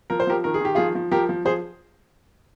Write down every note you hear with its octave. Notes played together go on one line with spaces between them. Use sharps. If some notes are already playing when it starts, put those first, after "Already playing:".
F3 A#4
C5
F3 G4 A#4
D#3 A#4
G#4
D#3 G4
F3 F4 G#4
F3
F3 G4 A#4
F3
F3 G#4 C5